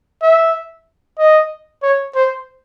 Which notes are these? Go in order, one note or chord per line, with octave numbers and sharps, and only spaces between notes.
E5
D#5
C#5
C5